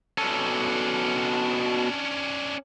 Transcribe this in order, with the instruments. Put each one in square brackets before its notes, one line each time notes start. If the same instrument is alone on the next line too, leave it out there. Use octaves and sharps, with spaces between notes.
[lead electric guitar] B2 A4 [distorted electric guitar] C#4 D4